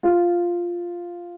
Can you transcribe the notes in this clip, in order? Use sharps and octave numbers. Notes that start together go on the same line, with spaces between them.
F4